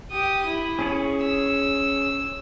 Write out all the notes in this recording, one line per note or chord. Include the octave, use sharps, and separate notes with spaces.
G4 D#6
E4
C#4 G#4 C#5
E6